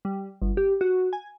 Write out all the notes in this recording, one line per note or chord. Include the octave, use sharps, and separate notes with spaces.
G3
G1
G4
F#4
G#5